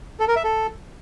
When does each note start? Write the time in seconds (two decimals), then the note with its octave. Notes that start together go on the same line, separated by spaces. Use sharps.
0.20 A4
0.28 A#4
0.36 E5
0.44 A4